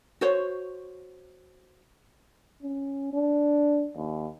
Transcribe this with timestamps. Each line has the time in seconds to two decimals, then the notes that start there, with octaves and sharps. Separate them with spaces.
0.21 F#4 C5 C#5
2.63 C#4
3.14 D4
3.96 D#2